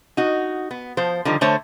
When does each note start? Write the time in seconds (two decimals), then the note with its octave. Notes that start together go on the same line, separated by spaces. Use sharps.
0.17 D#4 F#4
0.71 B3
0.97 F3 C5
1.25 D3 D#3 F3 G3
1.41 D3 A3 C5 C#5